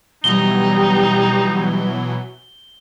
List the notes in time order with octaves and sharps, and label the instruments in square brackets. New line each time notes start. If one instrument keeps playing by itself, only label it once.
[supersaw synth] B2 E3 F#3 [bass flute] G3 [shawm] D#4 [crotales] G7